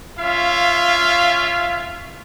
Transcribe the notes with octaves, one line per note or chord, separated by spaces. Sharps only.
C#4 F4 E5 F5